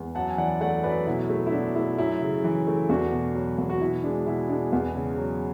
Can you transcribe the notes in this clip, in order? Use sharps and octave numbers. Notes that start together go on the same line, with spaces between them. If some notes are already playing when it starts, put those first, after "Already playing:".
Already playing: E2
F#2 F#5 A5
G#5
E3 D5 F#5
A3 D5 F#5
F#2 B4 D5
B2 E4
A3
E4
B2 D4
A3 E4
F#2 E4
C#3
E3
A3
E2 D4 F#4
B2
F#3
E2
F#4
B2 E4
G#3 D4
B2 E4
G#3 D4
E2
C#3
F#3